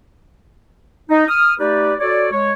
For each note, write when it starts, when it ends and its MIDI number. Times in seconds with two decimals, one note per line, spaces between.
1.10 1.25 63
1.28 1.54 87
1.28 1.54 89
1.59 1.94 57
1.59 1.94 63
1.59 1.94 67
1.59 1.94 71
1.59 1.94 74
1.99 2.30 66
1.99 2.30 69
1.99 2.30 73
1.99 2.30 74
2.32 2.52 56
2.32 2.52 73